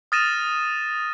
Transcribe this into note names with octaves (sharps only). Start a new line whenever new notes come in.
D#6 F6 A6 A#6 D#7 E7